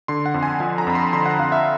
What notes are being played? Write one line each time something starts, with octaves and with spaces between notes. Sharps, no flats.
D3 C6
F#5
F2
G#5
F3 G#5
A#5
F2 B5
C6
D3 C6
F#5
F2 F5
E5